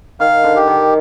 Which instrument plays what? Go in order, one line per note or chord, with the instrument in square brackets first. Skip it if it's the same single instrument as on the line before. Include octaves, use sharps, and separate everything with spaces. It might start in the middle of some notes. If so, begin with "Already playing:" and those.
[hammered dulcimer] D#3 [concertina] F5
[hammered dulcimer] D3
[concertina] G4
[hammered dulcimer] D#3